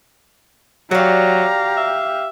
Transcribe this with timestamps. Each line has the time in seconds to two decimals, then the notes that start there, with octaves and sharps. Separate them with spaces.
0.91 F#3 F#4 G4 D5 F5 A#5
1.77 E5